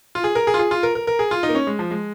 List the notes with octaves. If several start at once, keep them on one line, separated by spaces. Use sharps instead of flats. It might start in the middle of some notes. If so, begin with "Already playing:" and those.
F4
G#4
A#4
G#4
F4
G#4
F4
A#4
A#4
A#4
G#4
F4
D#4
A#3
C#4
G#3
F3
G#3